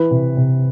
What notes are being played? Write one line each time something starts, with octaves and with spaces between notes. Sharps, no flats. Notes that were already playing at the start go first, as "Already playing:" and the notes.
Already playing: E3 B4
C3
C3